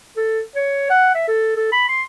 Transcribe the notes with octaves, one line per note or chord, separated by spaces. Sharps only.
A4
C#5
F#5
E5
A4
A4
B5
C6